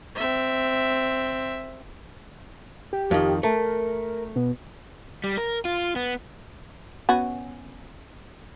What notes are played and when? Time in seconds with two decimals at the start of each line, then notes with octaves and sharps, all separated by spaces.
0.16 C4 E5
2.93 G4
3.11 F2 D#3
3.43 A3 A#4
4.36 B2
5.24 G3
5.38 A#4
5.65 F4
5.96 B3
7.09 B3 C#4 F#4